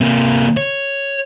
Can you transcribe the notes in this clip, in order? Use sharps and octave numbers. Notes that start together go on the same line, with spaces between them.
C3 A#3
C#5